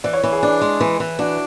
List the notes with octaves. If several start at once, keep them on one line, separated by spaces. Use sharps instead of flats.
E3 D5
C#5
E3
G#4
D4
G#3
E3
E3
D4 F#4